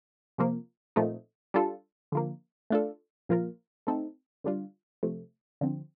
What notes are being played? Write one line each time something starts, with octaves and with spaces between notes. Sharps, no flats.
C3 F3 A#3
A#2 F3 A3 C4 D#4
G3 D4 F4 A4
D3 F3 A#3
A3 D4 F4 A4
A#2 F3 A#3 F4 A#4
A3 C4 D#4 A4
D3 G3 D4 F4
C3 F3 A3
D3 F3 C4